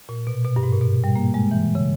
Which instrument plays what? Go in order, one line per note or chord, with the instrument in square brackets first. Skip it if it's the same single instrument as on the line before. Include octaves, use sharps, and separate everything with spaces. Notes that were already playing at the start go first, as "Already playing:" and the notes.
[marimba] A#2
B2
B2
G2
G#2
A#2
B2
G3
A#3
G#3
E3
C#3